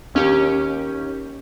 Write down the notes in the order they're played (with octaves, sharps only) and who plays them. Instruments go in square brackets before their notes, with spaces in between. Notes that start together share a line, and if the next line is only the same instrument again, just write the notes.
[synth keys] D#2 C#4 G4